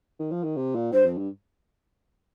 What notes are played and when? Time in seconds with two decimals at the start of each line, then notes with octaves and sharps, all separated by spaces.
0.19 D#3
0.31 F3
0.44 D#3
0.57 C3
0.75 A#2
0.93 G2 C5
1.05 F2
1.18 G2